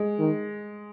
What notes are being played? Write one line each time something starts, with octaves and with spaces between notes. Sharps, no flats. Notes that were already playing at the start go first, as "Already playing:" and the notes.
Already playing: G#3
D#3